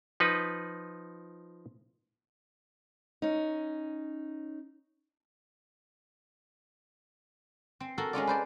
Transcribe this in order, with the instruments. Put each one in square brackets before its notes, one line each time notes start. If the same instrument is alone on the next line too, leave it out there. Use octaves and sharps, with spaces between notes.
[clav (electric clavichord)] F3 D#4 B4
[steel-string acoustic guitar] C#4 D#4
[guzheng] C4
F#4 A4 A#4
G#3 C#4 F4 D5
B4 C5 D5